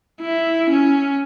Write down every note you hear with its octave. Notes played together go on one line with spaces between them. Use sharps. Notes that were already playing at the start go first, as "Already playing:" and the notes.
E4
C#4